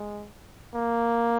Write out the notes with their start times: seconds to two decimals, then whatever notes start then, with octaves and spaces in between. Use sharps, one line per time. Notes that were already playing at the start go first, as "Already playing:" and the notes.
Already playing: G#3
0.75 A#3